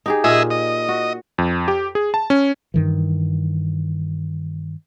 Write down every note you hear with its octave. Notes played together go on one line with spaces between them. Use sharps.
D#4 G4 G#4
A#2 G#4 D#5 E5
D#5
F#4
F2
G4
G#4
A5
C#4
G2 D#3 E3